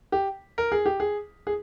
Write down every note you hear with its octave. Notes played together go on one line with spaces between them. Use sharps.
G4
A#4
G#4
G4
G#4
G#4